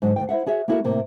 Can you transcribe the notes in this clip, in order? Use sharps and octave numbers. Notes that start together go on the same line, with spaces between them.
G#2 D3 F#3
D2 D#3 G5
E4 C5 E5 F#5
F#4 G#4 C#5 E5
A#3 B3 E4 F#4 A4 A#4
A2 C3 A#3